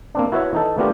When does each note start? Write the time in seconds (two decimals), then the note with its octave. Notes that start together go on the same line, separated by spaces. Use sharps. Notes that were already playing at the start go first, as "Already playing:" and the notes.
0.15 A#3 C4 D4
0.32 E4 F#4 B4 C#5 E5
0.53 E3 D#4 A4
0.78 A3 B3 D4 F4 G4 A#4